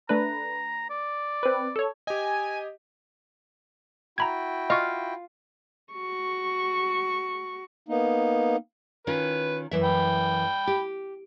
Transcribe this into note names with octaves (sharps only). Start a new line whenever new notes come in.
A3 D4 B4 A#5
D5
C4 B4
A4 C#5
G4 D#5 G#5
E4 F#4 G5 A#5 B5 G#6
F4 D#5 C#6
F#4 C#6
A#3 B3 D#4
D#3 C#4 F4 B4
F#2 E3 E5
G5 B5
G4